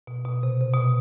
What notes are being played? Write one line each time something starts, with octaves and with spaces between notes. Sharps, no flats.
B2
B2
C3
C3
B2